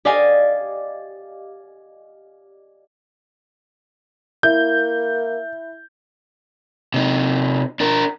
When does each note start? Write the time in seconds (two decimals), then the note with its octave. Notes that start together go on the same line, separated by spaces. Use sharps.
0.05 G4 D5 D#5 F5 G#5
4.43 A#3 E4 G6
6.94 C3 D#4
7.80 D4 A#4